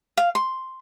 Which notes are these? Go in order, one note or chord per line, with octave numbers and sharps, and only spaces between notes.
F5
C6